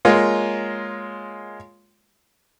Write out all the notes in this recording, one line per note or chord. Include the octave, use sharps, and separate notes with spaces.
G#3 A#3 F4 C#5